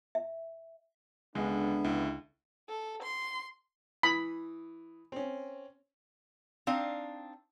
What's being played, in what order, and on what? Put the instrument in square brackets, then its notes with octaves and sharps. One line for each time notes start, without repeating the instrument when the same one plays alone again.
[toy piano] E5
[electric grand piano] C#2 [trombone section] D3 D4 [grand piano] G#3 [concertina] B3 E5
[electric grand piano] C#2 [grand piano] E4
[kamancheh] A4
C6
[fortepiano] E3 D#6 [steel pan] B5
[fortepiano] C4 C#4
[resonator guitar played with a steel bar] C4 D4 D#4 F5